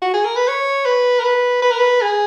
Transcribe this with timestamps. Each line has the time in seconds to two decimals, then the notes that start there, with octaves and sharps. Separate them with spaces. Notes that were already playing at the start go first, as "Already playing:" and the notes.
0.02 F#4
0.14 G#4
0.25 A#4
0.36 B4
0.48 C#5
0.85 B4
1.19 A#4
1.24 B4
1.62 B4
1.71 A#4
1.79 B4
2.01 G#4